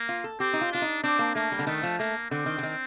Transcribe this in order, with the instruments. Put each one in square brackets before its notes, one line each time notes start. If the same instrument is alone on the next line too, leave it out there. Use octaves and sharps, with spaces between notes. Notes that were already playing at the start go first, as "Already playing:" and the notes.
Already playing: [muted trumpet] A#3
[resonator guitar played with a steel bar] F4
A4
[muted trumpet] C4 [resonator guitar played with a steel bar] G4
[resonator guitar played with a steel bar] D#4
F4
[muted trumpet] D4 [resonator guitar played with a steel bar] F4
[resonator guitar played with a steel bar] D#4
[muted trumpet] C4 [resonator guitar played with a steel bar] D4
[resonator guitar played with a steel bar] A#3
[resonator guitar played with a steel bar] A3 [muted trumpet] A#3
[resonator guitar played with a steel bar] G3
D3
[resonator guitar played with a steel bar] D#3 [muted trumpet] A3
[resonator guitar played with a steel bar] F3
[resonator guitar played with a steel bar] A3 [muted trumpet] A#3
[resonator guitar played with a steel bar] D3 [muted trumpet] C4
[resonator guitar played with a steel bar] D#3
D3
D#3